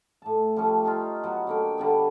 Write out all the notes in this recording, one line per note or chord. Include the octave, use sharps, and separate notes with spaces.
A2 A5
F3 G3 A3 C#4
C#4 D#4 F4
F#3 B3 F#4
D3 A#3 G5
D3 G3 B3